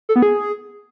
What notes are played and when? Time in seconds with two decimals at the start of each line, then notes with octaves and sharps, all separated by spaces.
0.09 A4
0.16 B3
0.22 G#4